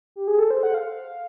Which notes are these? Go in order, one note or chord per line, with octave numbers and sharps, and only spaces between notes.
G4
G#4
A4
C5
F#5
F5